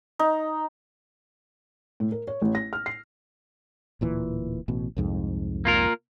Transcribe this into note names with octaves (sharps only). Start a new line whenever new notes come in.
D#4
A2
A#4
C#5
A1
A#6
F6
C7
D1 A#2 E3
A1 B2
C2 F2 G#2
A#3 F4 A#4